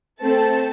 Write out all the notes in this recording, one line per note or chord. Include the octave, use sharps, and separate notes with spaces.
A3 C4 A4 A5